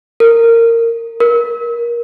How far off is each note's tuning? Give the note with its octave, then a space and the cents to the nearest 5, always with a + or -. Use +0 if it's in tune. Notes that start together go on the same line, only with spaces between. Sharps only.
A#4 -20
A#4 +20